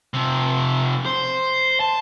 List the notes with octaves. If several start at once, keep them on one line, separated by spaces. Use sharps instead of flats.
C3 F3
C5
A5